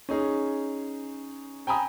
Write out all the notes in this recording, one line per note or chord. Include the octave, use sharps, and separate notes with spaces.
C#4 D#4 G#4
G5 G#5 A#5 B5 D#6